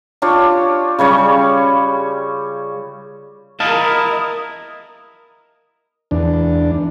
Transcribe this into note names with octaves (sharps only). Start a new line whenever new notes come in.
D4 F4 G4 C#5
C#3 G3 C#5 C#6
E4 A#4 D#5 F5 A5
E2 D4